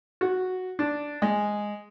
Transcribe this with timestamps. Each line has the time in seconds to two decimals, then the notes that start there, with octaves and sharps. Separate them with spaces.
0.21 F#4
0.79 D4
1.22 G#3